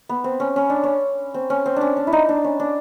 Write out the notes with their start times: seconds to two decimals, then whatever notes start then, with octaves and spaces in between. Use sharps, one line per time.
0.09 B3
0.24 C4
0.40 C#4
0.56 C#4
0.70 D4
0.84 C#4
1.34 C4
1.50 C#4
1.66 C4
1.76 C#4 D4
1.97 D4
2.07 E4
2.12 D#4
2.29 D4
2.44 C#4
2.60 D4